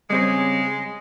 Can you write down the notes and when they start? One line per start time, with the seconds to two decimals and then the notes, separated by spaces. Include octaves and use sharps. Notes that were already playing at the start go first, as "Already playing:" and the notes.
0.10 C#3 G3 G#3 C4 C#5